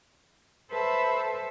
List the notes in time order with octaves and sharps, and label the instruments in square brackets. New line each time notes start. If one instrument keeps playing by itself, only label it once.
[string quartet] A4 B4 C5 E5 A5 B5